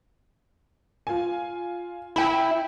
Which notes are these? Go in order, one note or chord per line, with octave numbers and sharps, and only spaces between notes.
F4 G#5
E4 G5 B5